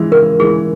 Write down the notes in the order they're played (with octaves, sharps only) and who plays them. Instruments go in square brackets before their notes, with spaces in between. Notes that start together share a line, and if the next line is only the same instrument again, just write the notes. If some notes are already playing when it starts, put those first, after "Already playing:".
Already playing: [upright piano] E3 G#3 E4
[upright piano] C#3 [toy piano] A#4
[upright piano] E3 G#3 E4 [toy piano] G#4